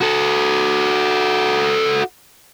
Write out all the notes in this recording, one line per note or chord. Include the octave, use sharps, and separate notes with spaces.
F#4 A4